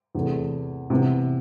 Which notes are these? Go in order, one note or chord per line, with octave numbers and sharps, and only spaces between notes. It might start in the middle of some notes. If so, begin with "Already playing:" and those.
E2 C3 E3 A3
C3 E3 B3